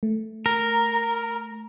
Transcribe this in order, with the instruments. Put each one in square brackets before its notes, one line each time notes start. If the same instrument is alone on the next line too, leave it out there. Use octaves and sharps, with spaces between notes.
[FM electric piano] A3
[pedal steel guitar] A#4 [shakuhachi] A#5